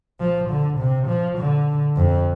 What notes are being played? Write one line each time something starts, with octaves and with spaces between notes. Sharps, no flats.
F3
D3
C3
F3
D3
F2